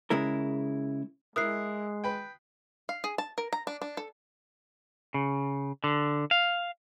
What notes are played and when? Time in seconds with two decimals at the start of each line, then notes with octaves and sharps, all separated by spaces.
0.10 C#3 G#3 E4 A#4
1.36 G#3 E4 A#4 D#6 F#6 C7
2.04 B4 G5
2.89 F5
3.04 G#4
3.18 A5
3.38 A#4
3.53 A#5
3.67 D4
3.82 D4
3.97 A4
5.14 C#3
5.84 D3
6.31 F5